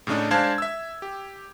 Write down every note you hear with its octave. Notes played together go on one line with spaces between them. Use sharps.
A2 C#3 A3 D4 D#4
G#3 D4 C5 F5 A5 G#6
E5 E6
G4